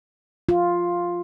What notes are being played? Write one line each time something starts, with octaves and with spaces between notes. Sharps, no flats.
F4